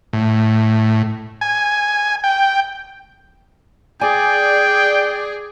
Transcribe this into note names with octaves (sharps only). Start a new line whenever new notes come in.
A2
G#5
G5
G#4 D5 G5 G#5